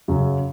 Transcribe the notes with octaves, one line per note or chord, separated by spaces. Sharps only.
F#2 C#3 F#3